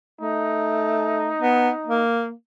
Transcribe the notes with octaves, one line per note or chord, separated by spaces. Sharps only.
A3 D#4
B3
A#3